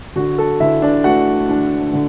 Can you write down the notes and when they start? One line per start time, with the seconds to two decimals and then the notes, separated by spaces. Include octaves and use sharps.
0.16 D3 F#4
0.38 A4
0.60 D3 E4 E5
0.82 D4 D5
1.04 A3 F#4 F#5
1.49 D4
1.93 D3